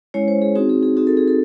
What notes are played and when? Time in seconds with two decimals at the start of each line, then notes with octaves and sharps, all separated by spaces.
0.14 G#3 C#4 E4 C#5
0.28 C5
0.42 G#4
0.56 C4 D#4 F#4 G#4
0.69 G#4
0.83 G#4
0.97 C4 D#4 F#4 G#4
1.07 A4
1.17 G#4
1.28 A4